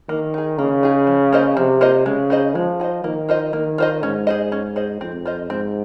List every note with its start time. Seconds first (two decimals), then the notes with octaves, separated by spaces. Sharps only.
0.09 D#3 A#3
0.34 D#4 G#4
0.58 C#3 A#3
0.83 D#4 G#4
1.07 F3
1.33 A#3 F4 C5 D#5
1.57 C3 F3
1.81 A#3 F4 C5 D#5
2.06 C#3 G#3
2.30 D#4 G#4 C5 D#5
2.55 F3 G#3
2.80 D#4 G#4 C5 D#5
3.04 D#3 A#3
3.29 F4 C5 D#5
3.53 D#3 A#3
3.78 F4 C5 D#5
4.03 G#2 C#4
4.27 G#4 C5 D#5
4.52 C#4
4.76 G#4 C5 D#5
5.01 F2 C4
5.25 F4 C5 D#5
5.50 G#2 C4